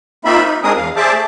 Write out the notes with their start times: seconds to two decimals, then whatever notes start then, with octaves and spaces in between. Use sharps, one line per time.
0.25 A#3 C4 D#4 F4 E5 B5
0.45 D#4
0.63 G#3 C4 D4 G#4 A#4 D#6
0.76 E2 F5
0.96 G#4 C5 D5 E5 A5 D6
1.13 A3